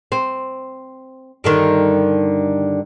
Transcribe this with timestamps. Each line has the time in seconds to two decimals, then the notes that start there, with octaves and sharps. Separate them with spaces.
0.12 C4
1.44 G2 D3 D#3